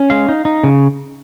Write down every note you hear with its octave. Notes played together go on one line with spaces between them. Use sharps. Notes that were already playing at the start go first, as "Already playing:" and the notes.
Already playing: C#4
G#3 F5
D#4
D#4
C#3